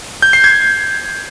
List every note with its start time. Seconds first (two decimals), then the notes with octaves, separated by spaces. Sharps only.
0.22 G6
0.33 C7
0.44 G#6